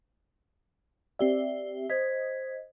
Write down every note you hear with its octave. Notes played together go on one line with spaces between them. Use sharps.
C4 G4 D5 E5
C5 D#5 G#6 B6